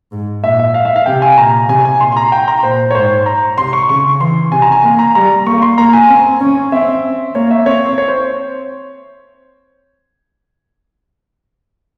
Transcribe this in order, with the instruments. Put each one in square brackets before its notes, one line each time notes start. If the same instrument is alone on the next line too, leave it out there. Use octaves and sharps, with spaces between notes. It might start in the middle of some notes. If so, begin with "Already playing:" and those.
[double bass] G#2
[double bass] A#2 [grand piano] E5
[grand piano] E5
F5
E5
F5
[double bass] C3 [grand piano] G5
[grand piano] G#5
[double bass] A#2 [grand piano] A#5
[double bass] C3 [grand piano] G#5
[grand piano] G#5
[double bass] A#2 [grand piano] C6
[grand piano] C6
A#5
G5
A#5
[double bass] A#2 [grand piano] C5
[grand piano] C#5
[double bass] G#2 [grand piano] C5
[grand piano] A#5
[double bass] C3 [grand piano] C6
[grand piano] C#6
[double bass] C#3 [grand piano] C#6
[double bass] E3 [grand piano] C6
[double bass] C3 [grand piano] G#5
[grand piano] A#5
G#5
[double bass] A#3
[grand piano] A#5
[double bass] G3 [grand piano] A#5
[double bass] A#3 [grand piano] C#6
[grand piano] C6
[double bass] A#3 [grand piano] A#5
[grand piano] G#5
[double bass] C4
C#4
[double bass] C4 [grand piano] E5
[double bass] A#3 [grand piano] C#5
[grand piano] E5
[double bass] C4 [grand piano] C#5
[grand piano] C#5
C5